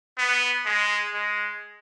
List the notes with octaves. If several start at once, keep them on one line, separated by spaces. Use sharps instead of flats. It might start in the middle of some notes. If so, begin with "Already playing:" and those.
B3
G#3
G#3